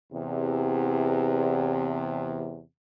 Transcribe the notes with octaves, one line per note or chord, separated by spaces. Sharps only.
E2 C3